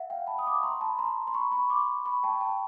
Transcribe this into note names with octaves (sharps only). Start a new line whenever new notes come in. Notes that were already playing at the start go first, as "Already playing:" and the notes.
Already playing: E5 F#5
F5 G5
A5 B5
D#6
D6
C#6
A#5 C6
A5 B5
A#5 C6
C6
B5 C#6
B5 C#6
C6 D6
B5 C#6
G5 A5
G5 A5